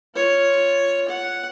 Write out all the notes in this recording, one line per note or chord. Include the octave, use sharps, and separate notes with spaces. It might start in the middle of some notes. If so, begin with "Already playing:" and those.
F4 C#5
F#5